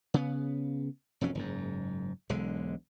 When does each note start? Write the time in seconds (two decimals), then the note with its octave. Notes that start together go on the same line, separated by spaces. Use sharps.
0.14 C#3 B3
1.21 E1 F2 F#3 C#4
1.35 F#1 G#2
2.29 E1 B1 D3 G#3